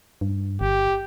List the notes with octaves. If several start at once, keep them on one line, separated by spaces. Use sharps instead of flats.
G2
G1 G4